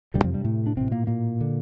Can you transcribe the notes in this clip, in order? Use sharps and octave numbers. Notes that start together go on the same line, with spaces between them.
E1 D2 G2 C3 G3
F2 F3
G2 G3
A2 A3
D4
A1 A2 C3 C4
A#2 A#3
A#2 A#3
D3